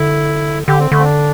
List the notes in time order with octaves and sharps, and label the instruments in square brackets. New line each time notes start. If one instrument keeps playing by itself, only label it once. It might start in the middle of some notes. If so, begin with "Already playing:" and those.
Already playing: [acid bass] D3 [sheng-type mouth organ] E4
[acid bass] D3 [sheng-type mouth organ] G4
[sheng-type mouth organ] C4
[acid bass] D3 [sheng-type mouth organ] A3
[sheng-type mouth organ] C4
D4